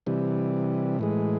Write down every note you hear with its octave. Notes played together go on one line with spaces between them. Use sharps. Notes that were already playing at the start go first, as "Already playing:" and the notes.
C3 E3 G3
A2 E3 G#3